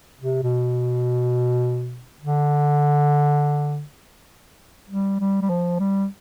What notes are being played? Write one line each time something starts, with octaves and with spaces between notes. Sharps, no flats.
C3
B2
D3
G3
G3
G3
F3
G3